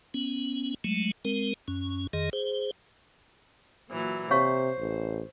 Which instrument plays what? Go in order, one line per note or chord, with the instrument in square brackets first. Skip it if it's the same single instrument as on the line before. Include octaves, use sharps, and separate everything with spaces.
[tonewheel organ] B3 C#4
F#3 G#3 A3
G#3 C4 A#4
F#2 C#4
F2 D#3 G#4 D#5
G#4 C5
[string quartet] A#2 E3 F#3
[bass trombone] C3 [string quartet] C5 [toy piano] C#5 F5 C#6
[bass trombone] A1